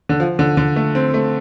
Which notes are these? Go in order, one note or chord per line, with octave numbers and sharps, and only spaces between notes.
D3
F3
D3
D3
A3
C4
A3